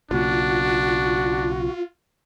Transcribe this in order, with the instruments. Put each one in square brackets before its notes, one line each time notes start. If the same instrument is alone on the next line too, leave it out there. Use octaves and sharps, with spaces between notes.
[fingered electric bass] B1 C#3 A#3 [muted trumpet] D4 [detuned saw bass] F4 [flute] F#4